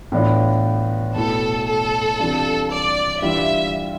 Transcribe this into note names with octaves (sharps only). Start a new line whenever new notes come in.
A2 E3 B3 D4 F4
B2 A3 E4 A4
A4
C3 E3 G3 D4 F4
D5
E3 G3 D4 F4 E5